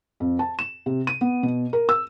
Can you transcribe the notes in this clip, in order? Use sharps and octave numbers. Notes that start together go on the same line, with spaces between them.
F2
A5
E7
C3
D#7
B3
B2
A#4
E6